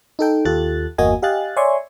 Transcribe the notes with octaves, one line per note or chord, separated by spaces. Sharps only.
D#4 A4 G5
D#2 F4 G4 A4 F#6 A6
G1 E2 A#3 F#4 D#5 G#5
G4 D#5 F5 G#5 F#6 A6
C#5 D5 E5 G#5 C6 C#6